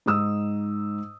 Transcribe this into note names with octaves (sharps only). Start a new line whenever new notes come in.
G#2 D#4 D#6 E6